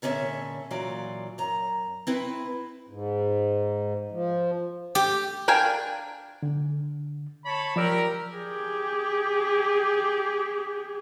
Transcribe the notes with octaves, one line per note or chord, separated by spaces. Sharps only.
A#2 D3 C#4 E4 G#4 E5
A#2 E3 F#3 F4 D5
F#2 A#5
C4 E4 B4
G#2
F3
G4
D4 A#4 F5 G5 G#5
D3
C#5 A5 B5
F3 G4 A#4 D5 E6
G4 G#4